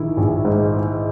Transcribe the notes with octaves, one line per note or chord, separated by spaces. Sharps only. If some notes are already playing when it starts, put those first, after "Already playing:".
Already playing: A#1 D#3 E4
A#1
G#2